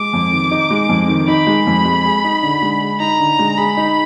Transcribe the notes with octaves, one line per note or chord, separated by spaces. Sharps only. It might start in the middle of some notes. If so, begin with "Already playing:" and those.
Already playing: G#3 D6
F2
D#3
D#4
G#3
F2
D#3
D#4 B5
G#3
F2
G#3
G#4
D#4
D3
G#3
G#4
D#4 A#5
D3
G#3
G#4 B5
D#4